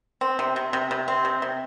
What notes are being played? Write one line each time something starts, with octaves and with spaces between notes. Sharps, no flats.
C4
C3
C3
C3
C3
C4
C3
C3